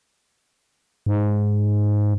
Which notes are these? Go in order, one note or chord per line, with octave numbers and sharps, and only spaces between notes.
G#2